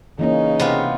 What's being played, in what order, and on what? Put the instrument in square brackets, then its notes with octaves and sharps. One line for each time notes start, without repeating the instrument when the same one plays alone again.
[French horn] C#3 [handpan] E3 A#3 C#4 [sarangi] D#4
[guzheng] C3 B3 F4